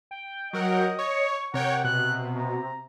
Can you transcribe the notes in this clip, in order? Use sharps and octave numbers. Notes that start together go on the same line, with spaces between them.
G5
F#3 A#4 D#5 F#5
C#5 C#6
C3 A#4 C#5 F#5 G5
B2 F#6
A#5